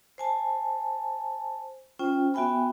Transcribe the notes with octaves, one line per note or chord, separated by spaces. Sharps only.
C5 G#5 A5
C#4 F4 C5 G5
B3 F#4 E5 G5 G#5 B5